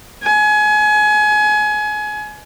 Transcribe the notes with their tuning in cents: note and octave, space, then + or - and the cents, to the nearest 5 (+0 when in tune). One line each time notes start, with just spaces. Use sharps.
G#5 +30